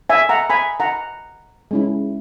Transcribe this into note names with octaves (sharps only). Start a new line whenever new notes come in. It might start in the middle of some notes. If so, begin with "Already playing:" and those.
E5 G#5
F#5 A#5
G#5 B5
F#5 A#5
G#3 C#4 E4